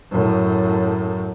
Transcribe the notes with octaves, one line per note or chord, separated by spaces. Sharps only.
F#2 A2